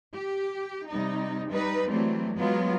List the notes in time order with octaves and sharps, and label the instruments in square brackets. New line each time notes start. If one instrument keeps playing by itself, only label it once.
[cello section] G4
C3 G3 D#4
G3 D#4 B4
E3 F#3 G3 A3 C4
F#3 G#3 B3 F4